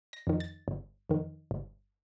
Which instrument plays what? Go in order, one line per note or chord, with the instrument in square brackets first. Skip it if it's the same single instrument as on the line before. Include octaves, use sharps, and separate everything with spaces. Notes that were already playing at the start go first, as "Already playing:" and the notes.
[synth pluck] A#6
F2 D#3
A6
G1
F2 D#3
G1